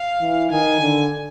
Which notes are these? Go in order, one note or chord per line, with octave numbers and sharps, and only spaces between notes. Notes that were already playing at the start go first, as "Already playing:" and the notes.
Already playing: F5
E3
D#3 G#5
D3